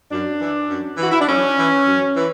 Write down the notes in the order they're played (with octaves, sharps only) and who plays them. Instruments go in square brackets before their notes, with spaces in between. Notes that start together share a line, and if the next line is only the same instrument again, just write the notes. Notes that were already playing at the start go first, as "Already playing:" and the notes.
[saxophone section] F#2 D4
E3
F#2
E3 F#4
E4
D4
F#2 C#4
E3
F#2
E3